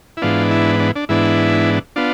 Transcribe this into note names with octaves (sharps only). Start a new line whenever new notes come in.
E4
G#2 E3 B3 D4 F4
E4
D4
D4
G#2 E3 B3 D4 E4
B3 D4 F4